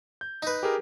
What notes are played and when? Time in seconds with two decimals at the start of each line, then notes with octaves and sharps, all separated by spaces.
0.21 G6
0.42 D#4 B4
0.63 G4 G#4 A#4